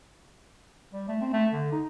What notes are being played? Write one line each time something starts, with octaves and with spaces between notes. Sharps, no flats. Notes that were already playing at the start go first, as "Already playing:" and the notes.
G3
A3
C4
A3
D3
D#4